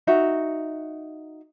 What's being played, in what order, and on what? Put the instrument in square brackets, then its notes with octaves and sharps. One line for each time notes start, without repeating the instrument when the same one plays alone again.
[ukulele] D#4 F#4 E5